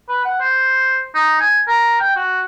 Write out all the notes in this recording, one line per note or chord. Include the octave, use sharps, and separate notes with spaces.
B4
F#5
C5
D#4
G#5
A#4
G5
F#4